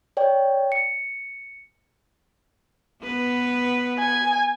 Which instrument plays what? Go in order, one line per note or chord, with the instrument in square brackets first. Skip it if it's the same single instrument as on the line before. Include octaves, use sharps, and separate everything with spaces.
[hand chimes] C#5 D5 G5
C#7
[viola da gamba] B3 B4
[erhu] G#5